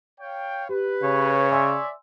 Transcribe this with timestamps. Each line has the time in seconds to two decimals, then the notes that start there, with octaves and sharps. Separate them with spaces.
0.20 C#5 F5 G5
0.69 G4 B4
1.03 C#3 C#5
1.51 D5 E5 G#5 C6 E6